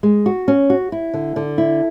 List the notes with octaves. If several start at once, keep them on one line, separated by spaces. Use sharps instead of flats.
G#3
F#4
C#4
F#4
E4
D3
D3
E4